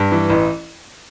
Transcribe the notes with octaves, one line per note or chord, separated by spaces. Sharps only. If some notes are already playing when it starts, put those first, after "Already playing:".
Already playing: G2
E3
A1